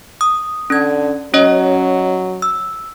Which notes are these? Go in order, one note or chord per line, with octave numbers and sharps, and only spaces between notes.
D#6
D3 C#4 G#6
F#3 C#4 C#5 D#5
E6